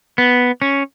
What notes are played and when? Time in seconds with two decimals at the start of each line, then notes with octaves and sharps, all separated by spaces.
0.18 B3
0.62 C#4